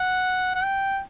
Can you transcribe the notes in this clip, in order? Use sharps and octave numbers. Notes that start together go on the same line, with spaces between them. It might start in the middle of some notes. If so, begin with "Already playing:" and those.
Already playing: F#5
F#5
G5